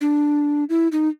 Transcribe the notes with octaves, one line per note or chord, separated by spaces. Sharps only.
D4
E4
D#4